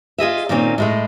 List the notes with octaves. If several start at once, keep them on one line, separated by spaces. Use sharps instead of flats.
F4 G#4 D#5 E5
A#2 D#3 A#3 C4 C#4
A2 G#3 A3